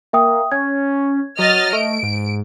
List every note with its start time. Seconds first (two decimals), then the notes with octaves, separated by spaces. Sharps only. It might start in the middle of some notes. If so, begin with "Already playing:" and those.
0.13 A#3 E5 G5 D#6
0.52 C#4 G#6
1.39 F#3 D#5 F6 A6
1.73 A3 D7
2.03 G#2